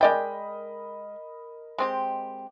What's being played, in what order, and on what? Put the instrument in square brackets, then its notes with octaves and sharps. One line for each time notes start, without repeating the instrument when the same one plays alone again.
[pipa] G#3 D5 G5 [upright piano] A#4 D#5 B5
[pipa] G#3 C4 G4